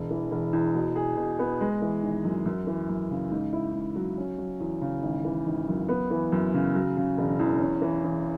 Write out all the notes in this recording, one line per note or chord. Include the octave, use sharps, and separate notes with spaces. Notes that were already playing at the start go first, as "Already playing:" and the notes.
Already playing: E1
E3
E1
E2
B2
G#4
B2
B3
G#3
E3
G#1
F#2
F#2
E3
F#2
C#3
G#2
E4
G#2
F#3
C#4
F#3
E2
C#3
G#1
E3
G#1
F#2
B3
E3
F#2
C#3
F#3
C#3
E1
E2
C#4
E3
E2